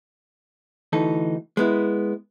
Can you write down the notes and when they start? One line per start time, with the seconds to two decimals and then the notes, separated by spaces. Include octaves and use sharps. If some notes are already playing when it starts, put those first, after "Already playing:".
0.93 D2 E3 D#4 A4
1.57 G#3 B3 E4